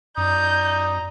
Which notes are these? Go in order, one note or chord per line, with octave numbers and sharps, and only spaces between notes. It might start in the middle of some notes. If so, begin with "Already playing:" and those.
F#2 D5 A#5 D#6 G6